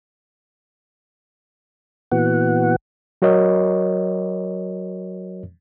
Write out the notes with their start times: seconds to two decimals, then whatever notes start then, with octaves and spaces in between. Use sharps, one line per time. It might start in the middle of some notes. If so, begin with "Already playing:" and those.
2.12 A#2 E3 B3 F#4 F#5
3.22 F#3 F#4 A#4 C#5 D#5